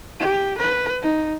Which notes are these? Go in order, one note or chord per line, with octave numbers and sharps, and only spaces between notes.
G4
B4
D#4